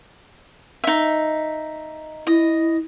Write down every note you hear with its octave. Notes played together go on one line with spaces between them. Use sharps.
D#4 E5
E4 D#5